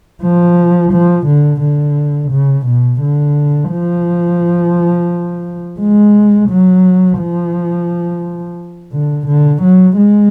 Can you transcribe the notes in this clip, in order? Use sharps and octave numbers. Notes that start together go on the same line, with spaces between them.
F3
F3
D3
D3
C#3
B2
D3
F3
G#3
F#3
F3
D3
D3
F#3
G#3